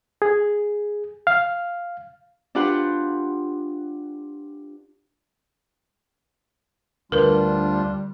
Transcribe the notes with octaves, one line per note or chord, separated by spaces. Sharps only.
G#4
F5
D4 F4 G4 B4 F#5 C6
D2 G3 D4 F4 A#4 B4